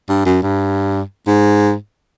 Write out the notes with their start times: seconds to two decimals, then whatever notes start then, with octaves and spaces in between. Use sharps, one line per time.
0.09 G2
0.26 F#2
0.43 G2
1.27 G#2